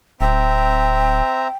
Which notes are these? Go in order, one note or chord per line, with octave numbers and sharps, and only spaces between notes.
D1 C4 E5 G5 A#5